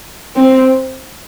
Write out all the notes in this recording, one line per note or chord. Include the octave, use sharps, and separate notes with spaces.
C4